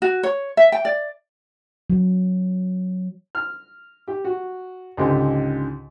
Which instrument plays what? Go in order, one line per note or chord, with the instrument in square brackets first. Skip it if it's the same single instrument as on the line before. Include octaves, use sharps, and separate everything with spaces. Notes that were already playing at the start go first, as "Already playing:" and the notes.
[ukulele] F#4
C#5
E5
G5
D5
[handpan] F#3
[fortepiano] F6
G4
F#4
C#2 G#2 D3 G4